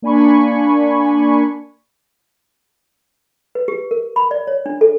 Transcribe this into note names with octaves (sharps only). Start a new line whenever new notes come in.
A#3 D4 G#5 B5 C#6
B4
G4
A#4
B5
D5
C#5
D4
A4